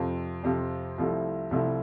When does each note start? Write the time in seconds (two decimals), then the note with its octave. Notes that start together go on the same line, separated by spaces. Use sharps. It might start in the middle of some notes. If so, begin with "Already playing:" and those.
Already playing: F2 C3 F3
0.43 F2 C3 F3
0.98 C2 C3 F3 A3 E4
1.51 C2 C3 F3 A3 E4